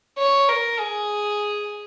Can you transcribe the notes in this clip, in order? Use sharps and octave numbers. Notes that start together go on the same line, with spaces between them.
C#5
A#4
G#4